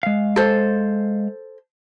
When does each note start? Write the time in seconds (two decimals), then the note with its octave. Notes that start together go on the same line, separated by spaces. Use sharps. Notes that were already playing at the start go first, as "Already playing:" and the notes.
0.03 G#3 F5
0.36 A4 C5